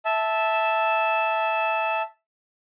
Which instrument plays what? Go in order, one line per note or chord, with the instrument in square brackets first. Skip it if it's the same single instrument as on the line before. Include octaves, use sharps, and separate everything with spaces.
[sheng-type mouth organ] E5 A5